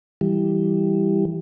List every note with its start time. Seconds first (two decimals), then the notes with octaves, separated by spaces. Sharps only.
0.21 E3 G3